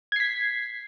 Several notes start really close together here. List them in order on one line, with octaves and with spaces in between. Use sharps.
G#6 C7 B6